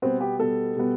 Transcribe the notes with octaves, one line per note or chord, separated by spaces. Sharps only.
B2 G3 B3 C4
G4
B2 G3 B3 A4
B2 G3 B3